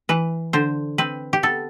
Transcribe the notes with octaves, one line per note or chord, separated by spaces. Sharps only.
E3 B4
D3 C5
C4 B4
G4
B3 A4